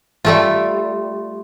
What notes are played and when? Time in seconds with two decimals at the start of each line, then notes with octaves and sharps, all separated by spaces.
0.25 G3 A3 F4